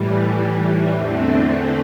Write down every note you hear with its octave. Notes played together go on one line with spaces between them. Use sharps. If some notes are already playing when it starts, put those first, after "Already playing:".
Already playing: A2 E3 G3
E2 D3 A3 C4